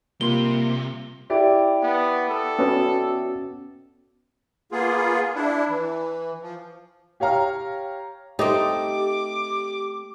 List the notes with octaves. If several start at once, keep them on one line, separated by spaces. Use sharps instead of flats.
C3 G3 A#3 F4 C6 G7
E4 G4 D5
B3
A4
B3 C#4 F#4
A#3 B3 F4 G#4
D4 E4
E3
F3
G4 C#5 F5 A#5 F6
A3 C4 D#4 G4 D6